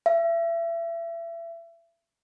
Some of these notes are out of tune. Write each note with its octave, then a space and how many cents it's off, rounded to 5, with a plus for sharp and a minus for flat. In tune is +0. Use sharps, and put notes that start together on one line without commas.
E5 +30